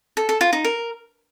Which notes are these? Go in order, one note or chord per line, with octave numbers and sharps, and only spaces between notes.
A4
A4
F4
D#4
A#4